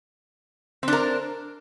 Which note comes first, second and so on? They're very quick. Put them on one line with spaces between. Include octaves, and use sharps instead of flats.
C4 D4 A#4